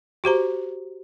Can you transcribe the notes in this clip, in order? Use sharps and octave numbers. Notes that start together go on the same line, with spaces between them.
F#4 G4 C5 A#5